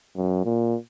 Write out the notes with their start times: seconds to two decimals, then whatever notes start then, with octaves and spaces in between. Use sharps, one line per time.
0.16 F#2
0.45 A#2